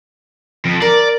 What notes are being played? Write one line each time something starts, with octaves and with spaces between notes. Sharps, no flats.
F2
A#4 D5